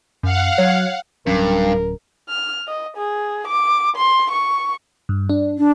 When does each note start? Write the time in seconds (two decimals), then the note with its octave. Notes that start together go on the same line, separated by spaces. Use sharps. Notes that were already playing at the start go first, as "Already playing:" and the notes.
0.23 F#2 F5 F#5
0.58 F#3 C#5
1.27 D1 G2 F#3 C#4 A#4
2.29 F6
2.67 D#5
2.97 G#4
3.48 D6
3.96 C6
4.31 C#6
5.09 G2
5.30 D4
5.58 D4